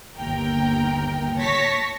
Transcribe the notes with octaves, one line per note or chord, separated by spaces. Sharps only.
G1 D#2 A#4 G5
C#5 A5 C#6 A#6 B6